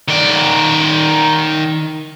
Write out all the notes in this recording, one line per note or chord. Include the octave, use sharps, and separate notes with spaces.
D#3 D5